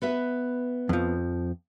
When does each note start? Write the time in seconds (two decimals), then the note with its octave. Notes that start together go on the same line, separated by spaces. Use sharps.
0.02 B3 B4 E5
0.89 F2 F3